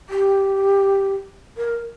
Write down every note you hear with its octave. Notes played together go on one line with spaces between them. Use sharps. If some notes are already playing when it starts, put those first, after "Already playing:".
G4
A#4